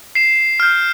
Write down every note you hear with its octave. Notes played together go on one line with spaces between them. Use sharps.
C7 E7
F6 G6